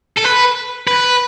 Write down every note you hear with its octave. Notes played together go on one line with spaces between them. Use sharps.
A4
B4
B4